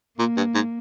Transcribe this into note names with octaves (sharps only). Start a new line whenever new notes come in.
A#2 A#3
G2
G#2